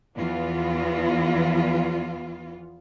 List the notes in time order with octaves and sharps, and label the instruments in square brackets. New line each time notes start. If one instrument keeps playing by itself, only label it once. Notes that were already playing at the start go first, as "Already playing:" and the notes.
[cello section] E2 E3 F3 B3 F4